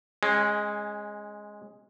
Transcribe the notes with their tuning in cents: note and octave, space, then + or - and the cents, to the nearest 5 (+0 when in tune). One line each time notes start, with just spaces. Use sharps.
G#3 +0 C#4 -20